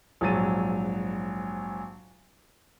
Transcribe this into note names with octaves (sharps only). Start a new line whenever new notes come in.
A#1 G#2 F#3 A6 D#7